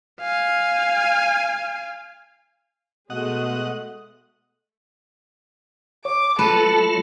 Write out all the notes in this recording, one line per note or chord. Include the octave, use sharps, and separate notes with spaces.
F5 G#5
B2 G#3 A3 D#5 F#5
C#5 D6
F#3 A3 F4 A4 B4